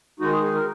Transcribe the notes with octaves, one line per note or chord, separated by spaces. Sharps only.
D#3 G#3 D#4 F#4
G#4
G#4
A#4